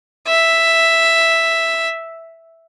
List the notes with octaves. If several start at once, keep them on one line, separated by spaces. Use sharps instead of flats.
E5